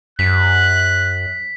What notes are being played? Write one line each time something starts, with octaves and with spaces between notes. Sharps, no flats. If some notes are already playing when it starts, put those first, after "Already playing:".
F#2 F#6 B6